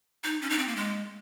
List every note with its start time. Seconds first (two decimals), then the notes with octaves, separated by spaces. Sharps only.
0.24 D#4
0.41 C#4
0.50 D#4
0.58 C4
0.68 A#3
0.76 G#3